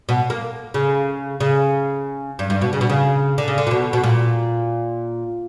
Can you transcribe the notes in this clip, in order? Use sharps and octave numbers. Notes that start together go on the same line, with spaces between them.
B2
A#3
C#3
C#3
G2
G2
B2
C#3
B2
C#3
D3
C#3
D3
A#2
B2
B2
A#2